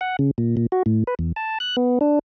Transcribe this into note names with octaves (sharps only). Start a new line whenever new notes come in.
F#5
C#3
A#2
A#2
F#4
A2
B4
E2
A5
F#6
B3
D4